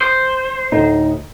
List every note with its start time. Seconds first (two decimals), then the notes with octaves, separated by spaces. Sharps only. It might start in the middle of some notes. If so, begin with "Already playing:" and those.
0.01 C5
0.72 D2 A2 D#4